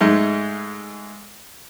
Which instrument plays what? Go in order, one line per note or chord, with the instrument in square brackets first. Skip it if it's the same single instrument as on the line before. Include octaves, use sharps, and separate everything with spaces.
[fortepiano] G#2 G#3 A3 D#4